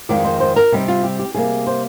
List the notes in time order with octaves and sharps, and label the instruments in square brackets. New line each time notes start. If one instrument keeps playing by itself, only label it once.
[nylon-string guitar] F2 D#3 G#3 D5
C5
C5
A#4
C3 G3 C4 D#4
F4
G4
G4
C3 G3 A#3 G#4
C5